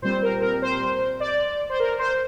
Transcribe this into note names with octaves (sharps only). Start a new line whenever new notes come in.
A#2 G3 C4 C5
A#4
A#4
C5
D5
C5
A#4
C5